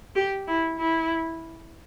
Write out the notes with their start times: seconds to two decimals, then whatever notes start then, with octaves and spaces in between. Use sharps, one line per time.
0.16 G4
0.48 E4
0.79 E4